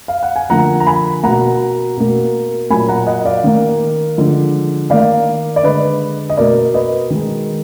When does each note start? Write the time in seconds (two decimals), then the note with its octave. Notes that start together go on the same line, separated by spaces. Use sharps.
0.08 F5
0.23 F#5
0.36 G#5
0.49 D3 F3 A#3 F#5 A#5
0.80 A#5
0.87 G#5 B5
1.23 B2 A#3 F#5 A#5
1.97 B2 A#3
2.70 A#2 F#3 A#3 G#5 B5
2.88 F#5 A#5
3.07 D#5 F#5
3.25 D5 F5
3.44 D#3 A#3
4.17 D3 F3 G#3
4.90 D#3 A#3 D5 F5
5.56 D5
5.63 D3 G#3 B4 D#5
6.30 D#5
6.37 B2 A#3 A#4 D5
6.74 B4 D#5
7.10 D#3 G#3